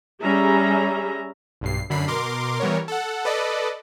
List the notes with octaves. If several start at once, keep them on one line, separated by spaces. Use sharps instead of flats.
G3 C#4 G#4 E5 A#5
B1 G2 C7
F#2 D3 B5 C7
B2 A#4 C6 D6
E3 G3 B3 A#4 C#5
A4 F#5
A4 B4 D5 D#5